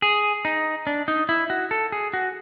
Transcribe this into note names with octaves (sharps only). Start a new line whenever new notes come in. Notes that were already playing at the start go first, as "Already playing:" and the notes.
G#4
D#4
D4
D#4
E4
F#4
A4
G#4
F#4